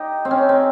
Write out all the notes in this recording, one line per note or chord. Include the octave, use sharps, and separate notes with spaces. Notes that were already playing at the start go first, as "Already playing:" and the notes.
Already playing: D#4 G4
C4
C#4
C4